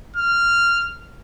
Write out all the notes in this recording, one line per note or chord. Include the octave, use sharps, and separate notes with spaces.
F6